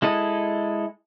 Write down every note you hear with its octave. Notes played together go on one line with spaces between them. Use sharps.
G#3 E4 A4 D#5